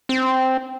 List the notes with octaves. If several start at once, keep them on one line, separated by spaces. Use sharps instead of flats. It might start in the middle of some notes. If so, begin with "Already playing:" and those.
C4